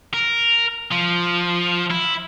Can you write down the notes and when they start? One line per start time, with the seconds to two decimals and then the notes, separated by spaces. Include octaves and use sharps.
0.14 A#4
0.92 F3
1.91 E4